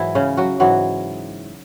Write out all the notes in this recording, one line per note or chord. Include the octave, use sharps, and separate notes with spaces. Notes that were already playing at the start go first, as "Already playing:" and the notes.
Already playing: G#2 E3 F#3 E4
C#3 C#4
F#3 F#4
G#2 E3 F#3 F#4